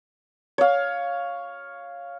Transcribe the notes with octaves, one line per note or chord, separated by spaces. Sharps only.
C#5 F5